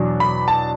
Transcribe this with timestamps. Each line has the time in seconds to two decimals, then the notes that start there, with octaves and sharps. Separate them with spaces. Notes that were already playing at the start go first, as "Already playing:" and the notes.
Already playing: E2 B2 F#3 D4
0.20 B5
0.48 A5